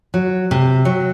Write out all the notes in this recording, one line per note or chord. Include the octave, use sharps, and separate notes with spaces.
F#3
C3
F#3